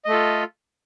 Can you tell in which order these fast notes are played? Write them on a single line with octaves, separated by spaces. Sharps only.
D#5 A3 A4 F4